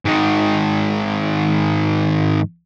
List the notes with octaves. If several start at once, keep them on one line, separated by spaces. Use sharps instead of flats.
G#2 D#3